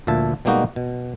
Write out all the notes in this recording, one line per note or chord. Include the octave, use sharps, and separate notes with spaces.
D2 A#2 F3 E5 A5
B2 G3 G#3 A#3 D#4 F#4
B2